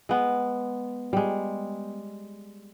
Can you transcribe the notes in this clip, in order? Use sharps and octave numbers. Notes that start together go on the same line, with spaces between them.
G#3 B3
G3 G#3